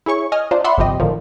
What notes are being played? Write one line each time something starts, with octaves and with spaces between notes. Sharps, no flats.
E4 G#4 C#5 C#6
D#5 G#5 F6
D4 D#4 F4 C5
D5 E5 F#5 B5 C6
G1 C3 F3 G4 D#5
A2 D3 D#3 F3